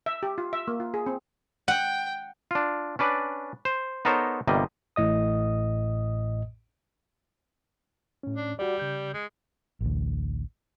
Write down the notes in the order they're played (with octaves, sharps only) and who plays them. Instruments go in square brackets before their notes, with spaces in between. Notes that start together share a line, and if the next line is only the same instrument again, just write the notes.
[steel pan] E5
G4
F4
E5
A#3
F4
G#4
C4
[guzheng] F#5 [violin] G5
[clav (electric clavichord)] D4 F4
C#4 D4 B4 D5
C5
B3 D#4 A4 A#4 C5 C#5
G1 C3 G3 A#3 D#5
[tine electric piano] A1 A2 D#5 D#6
[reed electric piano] A2 C#4
[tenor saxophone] D4
[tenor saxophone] G3 [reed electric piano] F#4 D5
[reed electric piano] C#3 G6
[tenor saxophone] G#3
[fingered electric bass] A1 D2